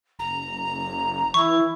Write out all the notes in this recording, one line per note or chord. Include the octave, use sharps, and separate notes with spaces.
F#1 A#5
E3 E4 C#6